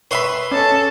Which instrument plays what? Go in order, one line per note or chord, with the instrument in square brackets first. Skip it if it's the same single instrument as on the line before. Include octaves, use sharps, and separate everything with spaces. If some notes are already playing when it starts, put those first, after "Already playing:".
[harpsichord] B4 C6 D#6 [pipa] C#5 E5 B5
[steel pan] C#4 [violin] A4 A5